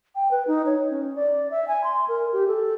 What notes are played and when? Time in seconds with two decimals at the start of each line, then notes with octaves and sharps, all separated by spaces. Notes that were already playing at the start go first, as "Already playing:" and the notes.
0.15 G5
0.31 B4
0.47 D#4
0.66 C#5
0.90 C#4
1.16 D5
1.51 E5
1.68 G#5
1.84 C6
2.08 A#4
2.33 G4
2.48 A4